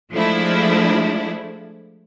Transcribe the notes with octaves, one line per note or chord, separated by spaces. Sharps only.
F3 G#3 A3 D4 E4